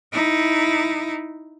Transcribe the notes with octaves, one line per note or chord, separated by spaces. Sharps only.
D#4 E4